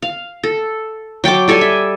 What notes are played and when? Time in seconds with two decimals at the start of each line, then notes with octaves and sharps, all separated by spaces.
0.02 F5
0.44 A4
1.24 F#3 G5 A5 D6
1.48 G3 A4 D5 G#5
1.61 E5